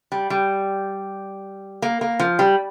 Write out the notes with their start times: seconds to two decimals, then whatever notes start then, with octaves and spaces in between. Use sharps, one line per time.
0.12 G3
0.30 G3
1.82 A#3
2.01 A#3
2.20 F3
2.39 G3